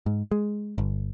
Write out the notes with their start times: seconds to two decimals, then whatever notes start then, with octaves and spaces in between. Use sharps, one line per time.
0.06 G#2
0.31 G#3
0.78 G1